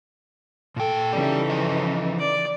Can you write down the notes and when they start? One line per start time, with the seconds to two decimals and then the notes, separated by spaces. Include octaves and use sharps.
0.76 A#2 A4 G5
1.13 C#3 E3 D#4 G4 D5
1.50 F3 D#5
2.19 D5